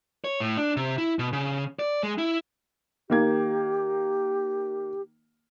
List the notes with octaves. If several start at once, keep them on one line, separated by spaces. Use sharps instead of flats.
C#5
A2
D4
C3
E4
B2
C#3
D5
G#3
E4
D#3 A#3 G4 G#6